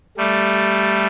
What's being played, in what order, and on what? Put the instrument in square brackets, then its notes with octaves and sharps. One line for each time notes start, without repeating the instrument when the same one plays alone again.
[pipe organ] G3 A3